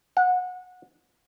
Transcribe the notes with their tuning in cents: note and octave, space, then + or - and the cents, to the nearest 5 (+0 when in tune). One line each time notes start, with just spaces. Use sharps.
F#5 -25